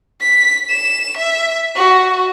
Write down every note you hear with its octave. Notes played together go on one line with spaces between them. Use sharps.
B6
E7
E5
F#4